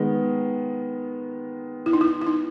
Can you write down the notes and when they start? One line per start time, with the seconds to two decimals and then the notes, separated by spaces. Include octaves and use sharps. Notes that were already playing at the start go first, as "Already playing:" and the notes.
Already playing: D#3 G#3 B3
1.86 E4
1.93 D#4
2.01 E4
2.21 E4
2.27 D#4